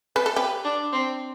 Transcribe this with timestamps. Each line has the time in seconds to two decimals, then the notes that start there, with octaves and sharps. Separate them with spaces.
0.16 B4
0.26 A4
0.36 G4 B4
0.64 D4
0.92 C4